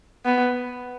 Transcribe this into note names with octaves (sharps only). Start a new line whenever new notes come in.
B3